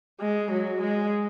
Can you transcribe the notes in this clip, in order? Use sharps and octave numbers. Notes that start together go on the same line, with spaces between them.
G#3
F#3
G#3